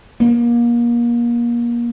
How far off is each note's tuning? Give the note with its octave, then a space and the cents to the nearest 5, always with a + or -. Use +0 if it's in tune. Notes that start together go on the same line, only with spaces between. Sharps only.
A#3 +30